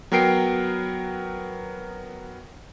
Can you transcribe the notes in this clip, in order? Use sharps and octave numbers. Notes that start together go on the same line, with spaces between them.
F#3 B3 A#4 G5 C7 D7